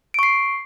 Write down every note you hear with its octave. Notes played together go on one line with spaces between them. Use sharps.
C#6 C7 D7